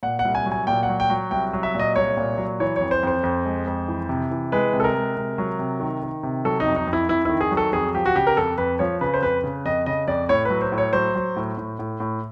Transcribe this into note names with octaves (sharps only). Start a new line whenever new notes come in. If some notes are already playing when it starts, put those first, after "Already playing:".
A#2 F#5
F#5
C2
G#5
F#3
G#5
A#2 G5
F#5
F#3
G5
F#3
C2 G5
F#3
E5
A#2 D#5
C2 C#5
A#2
F#3
E3 C#5
F2 C#5
C5
F2 C5
F2
G#3
F2
E3
C3
E3
G#3 B4
C3
A4
A#4
G#3
C3
F#3
C3
D#3
D#3
C3
F#3 A4
D#4
F2
D#4
F2
E4
F2 E4
D#3 E4
G#4
F#3
A4
F2 G#4
F3 G4
F#4
C#3 G4
A#4
F2 A4
F2 B4
F3 C#5
C#3 B4
C5
F2 B4
C#3
F2 D#5
C#3 D#5
F2 D5
A2 C#5
F#3 B4
C5
A2
C#5
F#3 C5
F#3
A2
A2
A2
A2